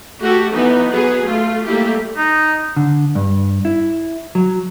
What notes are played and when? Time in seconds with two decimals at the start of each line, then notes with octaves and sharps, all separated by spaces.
0.22 A3 F#4 G4 A4
0.53 E3 B3 D#4
0.90 F#3 B3 G#4
1.26 A3 F4
1.66 G3 A3 A#3 E4 G4
2.17 D#4
2.76 D3
3.15 G2
3.65 E4
4.35 F#3